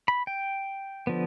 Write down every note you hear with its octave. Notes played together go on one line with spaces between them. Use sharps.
B5
G5
D3 F3 B3